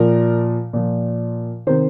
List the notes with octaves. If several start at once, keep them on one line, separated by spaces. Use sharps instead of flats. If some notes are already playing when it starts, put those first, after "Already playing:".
Already playing: A#2 F3 A#4
A#2 F3
C3 D#3 C5